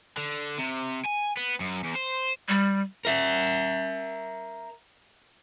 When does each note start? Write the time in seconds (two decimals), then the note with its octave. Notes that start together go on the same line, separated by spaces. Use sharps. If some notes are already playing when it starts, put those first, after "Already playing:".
0.17 D3
0.59 C3
1.06 G#5
1.37 B3
1.60 F#2
1.84 E2
1.96 C5
2.49 G3
3.05 A#4 E5